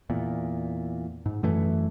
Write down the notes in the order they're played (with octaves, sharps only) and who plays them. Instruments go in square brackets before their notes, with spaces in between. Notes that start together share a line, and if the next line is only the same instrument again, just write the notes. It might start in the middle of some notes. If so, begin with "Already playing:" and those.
[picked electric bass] E2 A#2
G#2
F#2 E3 A3